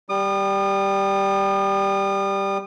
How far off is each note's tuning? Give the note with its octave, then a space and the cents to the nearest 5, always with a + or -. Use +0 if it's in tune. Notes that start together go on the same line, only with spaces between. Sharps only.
G3 +0 D#6 -40